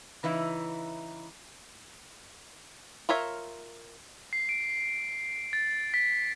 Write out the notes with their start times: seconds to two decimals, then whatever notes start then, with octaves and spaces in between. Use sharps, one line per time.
0.23 C#3 E3 D#4 E4
3.09 F4 A#4 C#5 E5
4.33 C7
4.49 D7
5.53 A6
5.94 B6